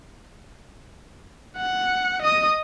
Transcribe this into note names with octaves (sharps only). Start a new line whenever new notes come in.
F#5
D#5 D#6